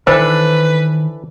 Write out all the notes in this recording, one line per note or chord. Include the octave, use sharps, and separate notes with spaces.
D#3 E3 D4 A4 B4 C5